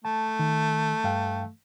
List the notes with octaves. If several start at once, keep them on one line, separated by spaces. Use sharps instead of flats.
A3 A5
D#3
G2 F5 G5